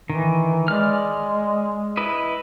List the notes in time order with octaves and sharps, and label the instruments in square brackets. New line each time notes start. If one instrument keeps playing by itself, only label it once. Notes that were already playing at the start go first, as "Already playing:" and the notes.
[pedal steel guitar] D#3 [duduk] E3
[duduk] G#3 [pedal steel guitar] D5 F6
[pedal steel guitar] E4 B4 D#5